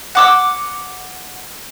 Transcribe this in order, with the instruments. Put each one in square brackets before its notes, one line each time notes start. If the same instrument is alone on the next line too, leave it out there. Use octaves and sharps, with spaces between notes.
[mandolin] F#5 D6 E6